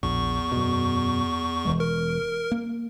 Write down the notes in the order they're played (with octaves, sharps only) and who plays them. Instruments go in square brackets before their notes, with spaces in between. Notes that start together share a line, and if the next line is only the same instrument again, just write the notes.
[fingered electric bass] A#1 [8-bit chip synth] E2 C#6
[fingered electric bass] F#2 B2
E1 E3 G#3
[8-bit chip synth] A#4
[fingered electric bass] A#3